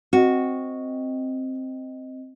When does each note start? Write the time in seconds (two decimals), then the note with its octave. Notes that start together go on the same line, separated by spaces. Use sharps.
0.13 C4 F#4 D#5